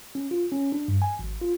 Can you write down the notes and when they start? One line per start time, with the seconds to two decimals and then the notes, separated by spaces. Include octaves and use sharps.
0.15 C#4
0.31 F4
0.52 C#4
0.72 D4
0.88 G2
1.02 G#5
1.19 G#1
1.41 F4